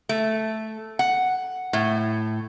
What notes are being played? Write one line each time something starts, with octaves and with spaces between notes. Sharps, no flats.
A3
F#5
A2